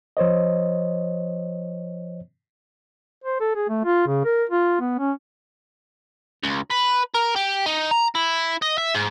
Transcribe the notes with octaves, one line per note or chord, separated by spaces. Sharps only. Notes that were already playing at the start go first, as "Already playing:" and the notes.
F3 C5 C#5 D#5
C5
A4
G#4
A3
F4
C#3
A#4
F4
B3
C#4
C#2
B4
A#4
G4
D#4
A#5
E4
D#5
E5
G#2